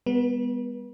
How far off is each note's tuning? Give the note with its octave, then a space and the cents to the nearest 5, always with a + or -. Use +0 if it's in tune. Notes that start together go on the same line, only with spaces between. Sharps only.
G#3 -45 B3 +0 B4 -40